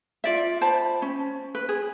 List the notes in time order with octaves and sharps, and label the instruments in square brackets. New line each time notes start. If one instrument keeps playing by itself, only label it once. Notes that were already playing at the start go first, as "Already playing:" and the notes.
[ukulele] F4 D5 E5
C5 A5 B5
C#4
B4
G#4